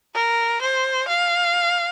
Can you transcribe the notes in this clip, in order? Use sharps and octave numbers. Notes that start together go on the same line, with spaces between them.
A#4
C5
F5